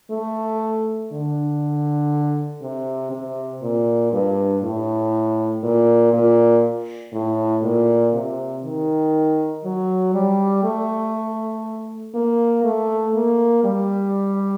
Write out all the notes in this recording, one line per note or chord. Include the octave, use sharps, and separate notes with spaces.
A3
D3
C3
C3
A#2
G2
A2
A#2
A#2
A2
A#2
C3
D#3
F#3
G3
A3
A#3
A3
A#3
G3